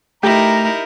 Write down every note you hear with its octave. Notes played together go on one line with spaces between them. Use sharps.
A3 D#4 E4 G4 A#4 A#5